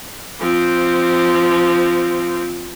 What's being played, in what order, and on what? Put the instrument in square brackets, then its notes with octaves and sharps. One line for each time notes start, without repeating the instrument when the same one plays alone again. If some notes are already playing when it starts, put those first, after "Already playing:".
[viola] F3 C4